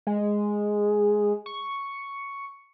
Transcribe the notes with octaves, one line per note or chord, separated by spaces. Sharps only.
G#3
C#6